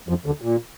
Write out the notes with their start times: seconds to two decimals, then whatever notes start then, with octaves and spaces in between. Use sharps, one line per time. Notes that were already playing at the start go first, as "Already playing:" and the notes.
0.09 F2 F3
0.26 D2 D3
0.41 A#2